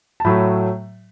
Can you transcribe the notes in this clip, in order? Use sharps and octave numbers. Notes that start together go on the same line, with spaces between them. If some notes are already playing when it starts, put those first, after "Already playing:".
A5
A2 F#3 A3 B5